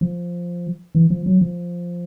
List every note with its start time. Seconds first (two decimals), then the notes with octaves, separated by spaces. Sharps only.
0.01 F3
0.95 E3
1.10 F3
1.26 F#3
1.41 F3